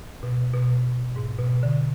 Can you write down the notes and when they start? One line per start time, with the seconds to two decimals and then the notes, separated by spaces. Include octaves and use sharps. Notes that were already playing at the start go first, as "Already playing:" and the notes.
0.23 B2
0.53 B2
1.16 G#2
1.39 B2
1.63 D3